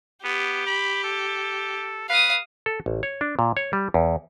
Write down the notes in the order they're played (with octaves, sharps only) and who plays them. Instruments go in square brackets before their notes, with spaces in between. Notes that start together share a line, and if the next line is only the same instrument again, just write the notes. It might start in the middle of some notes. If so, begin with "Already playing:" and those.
[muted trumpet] B3 [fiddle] G4
[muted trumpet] B5
A4
[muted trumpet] B4 [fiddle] F5 D#6
[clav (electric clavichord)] A4
A1
C#5
D4
A#2
C#5
G3
E2